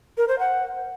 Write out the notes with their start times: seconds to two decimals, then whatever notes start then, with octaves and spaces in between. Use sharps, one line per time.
0.18 A#4
0.28 C5
0.39 F#5